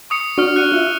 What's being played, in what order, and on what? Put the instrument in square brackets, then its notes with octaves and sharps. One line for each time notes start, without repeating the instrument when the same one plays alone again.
[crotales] C#6 D#6 C#7
[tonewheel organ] D4 F#4 [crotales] C#6 F6 C#7
[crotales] F#6 C#7 D#7
[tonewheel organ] F4 E5